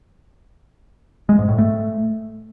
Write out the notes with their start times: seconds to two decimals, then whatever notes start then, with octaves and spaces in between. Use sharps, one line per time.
1.29 G#3
1.39 G#2
1.49 A2
1.58 A3